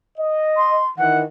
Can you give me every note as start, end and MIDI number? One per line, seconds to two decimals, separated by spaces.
0.18 0.80 75
0.57 0.87 84
0.98 1.24 51
0.98 1.24 52
0.98 1.18 78